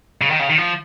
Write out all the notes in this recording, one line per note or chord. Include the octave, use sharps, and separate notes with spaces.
C#3
D#3
C#3
D#3
F3